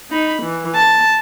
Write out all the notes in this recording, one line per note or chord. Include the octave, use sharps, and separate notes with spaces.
D#4 B5
E3
A5